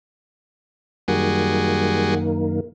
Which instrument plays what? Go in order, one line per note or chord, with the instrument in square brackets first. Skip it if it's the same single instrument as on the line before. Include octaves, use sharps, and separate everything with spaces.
[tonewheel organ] F#2 D#3 A#3 [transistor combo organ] G3 F#4 G#4